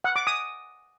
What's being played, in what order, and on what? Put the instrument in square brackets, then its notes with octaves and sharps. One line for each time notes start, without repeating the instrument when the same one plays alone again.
[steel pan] F#5
D6
D#6